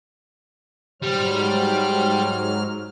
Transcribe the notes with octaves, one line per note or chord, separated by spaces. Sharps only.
G#2 F#3 G3 C5 F6